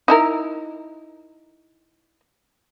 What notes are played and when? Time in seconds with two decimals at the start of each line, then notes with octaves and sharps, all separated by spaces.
0.08 D#4 E4 A#4